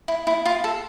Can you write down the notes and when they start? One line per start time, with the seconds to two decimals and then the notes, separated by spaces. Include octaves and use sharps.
0.08 E4
0.27 E4
0.45 F4
0.64 A4